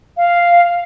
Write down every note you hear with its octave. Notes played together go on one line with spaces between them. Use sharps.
F5